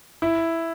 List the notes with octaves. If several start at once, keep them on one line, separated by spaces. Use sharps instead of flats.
E4